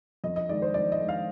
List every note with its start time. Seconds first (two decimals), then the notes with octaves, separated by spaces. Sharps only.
0.24 F2 D#5
0.36 D#5
0.49 D#3 G#3 D5
0.62 C5
0.74 F2 D5
0.92 D#5
1.00 D#3 G#3
1.09 F5